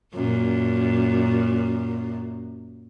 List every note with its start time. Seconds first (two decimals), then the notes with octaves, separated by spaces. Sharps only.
0.14 F#2 A#2